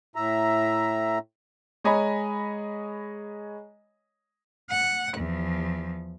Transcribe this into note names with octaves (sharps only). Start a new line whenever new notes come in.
A2 E5 A#5
G#3 C#5 D#5 G#5 A#5 B5
F#5
E2 F3